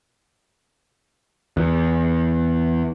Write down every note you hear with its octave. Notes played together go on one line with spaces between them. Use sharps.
E2